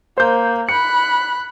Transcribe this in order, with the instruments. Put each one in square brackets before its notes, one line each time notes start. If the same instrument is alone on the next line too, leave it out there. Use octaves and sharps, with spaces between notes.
[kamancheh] A#3 [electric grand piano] C5 G6
[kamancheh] B5 F#6 [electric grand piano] C#7